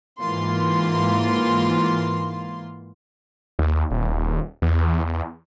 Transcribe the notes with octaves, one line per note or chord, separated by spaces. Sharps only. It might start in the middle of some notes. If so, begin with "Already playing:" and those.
G#2 E3 A#3 F4 C6
D#2
D#1
E2